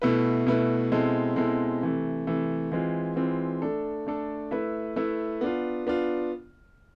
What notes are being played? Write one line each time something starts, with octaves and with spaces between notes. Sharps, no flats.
B2 A3 E4 B4
B2 A3 E4 B4
B2 G#3 C4 E4 A4
B2 G#3 C4 E4 A4
C3 E3 A3
C3 E3 A3
E3 G#3 C4 F4
E3 G#3 C4 F4
A3 D4 A4
A3 D4 A4
A3 E4 B4 E5
A3 E4 B4 E5
B3 D4 F4
B3 D4 F4